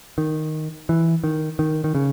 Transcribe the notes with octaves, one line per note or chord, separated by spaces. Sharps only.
D#3
E3
D#3
D#3
D#3
C#3